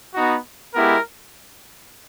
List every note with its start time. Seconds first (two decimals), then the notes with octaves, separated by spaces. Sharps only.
0.14 B3 D#4 F#4
0.74 G#3 B3 E4 G4 A#4